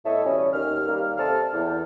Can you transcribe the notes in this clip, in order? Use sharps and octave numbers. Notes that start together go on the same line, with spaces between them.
A2 B3 A4 C#5 D#5 E5
B2 E3 G3 C#4
D#2 F6
D#3 G3 A#3
C3 C4 A4 D5 A5 F6
E2